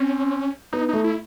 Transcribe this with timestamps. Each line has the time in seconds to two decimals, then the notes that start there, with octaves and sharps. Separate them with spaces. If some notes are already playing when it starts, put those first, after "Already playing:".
Already playing: C4 C#4
0.73 B3 D#4
0.89 A3 D#4
1.04 E4